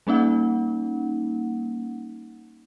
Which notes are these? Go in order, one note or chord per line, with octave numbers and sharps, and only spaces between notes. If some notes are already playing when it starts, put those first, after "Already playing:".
G3 A#3 C#4 D#4 F#5